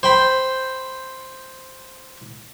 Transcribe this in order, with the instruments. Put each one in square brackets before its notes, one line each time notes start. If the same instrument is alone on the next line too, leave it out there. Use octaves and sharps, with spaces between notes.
[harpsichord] C5 G5 B5